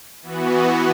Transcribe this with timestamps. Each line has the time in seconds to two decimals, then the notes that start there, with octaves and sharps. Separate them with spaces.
0.22 E3 B3 F#4